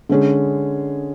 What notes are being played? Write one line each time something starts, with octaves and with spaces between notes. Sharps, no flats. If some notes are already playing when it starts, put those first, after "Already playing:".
D3 G#3 C#4 G#4